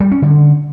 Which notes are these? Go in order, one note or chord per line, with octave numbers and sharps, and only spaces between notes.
G3
C#4
D3